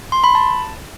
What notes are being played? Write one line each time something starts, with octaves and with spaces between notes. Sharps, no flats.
C6
B5
A5